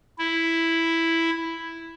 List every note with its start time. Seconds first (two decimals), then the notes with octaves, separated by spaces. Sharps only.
0.19 E4